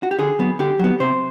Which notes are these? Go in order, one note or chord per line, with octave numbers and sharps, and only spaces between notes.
F#4
G4
D3 G#4
F#3 B3
D3 G4
F#3 B3
C3 C5